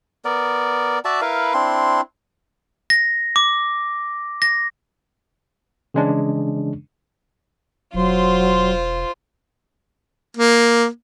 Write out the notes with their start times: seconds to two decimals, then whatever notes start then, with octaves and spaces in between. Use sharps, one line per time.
0.25 B3 A#4 D5
1.05 F#4 D5 E5 A5
1.21 E4 A#4 B4 F5
1.54 C4 D4 E4 C6
2.90 A#6
3.36 D6
4.42 A#6
5.94 C#3 E3 G#3 C#4 D4
7.94 E1 F#3 F4 C5
10.37 A#3